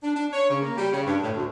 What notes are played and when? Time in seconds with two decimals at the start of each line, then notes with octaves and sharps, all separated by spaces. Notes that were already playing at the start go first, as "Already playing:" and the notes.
0.03 D4
0.16 D4
0.32 C#5
0.50 C#3
0.62 A#3
0.77 G3
0.92 C#3
1.06 G2
1.23 A2
1.36 D2